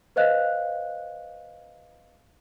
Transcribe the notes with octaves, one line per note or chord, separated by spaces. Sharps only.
B4 C5 D#5 F5 F#6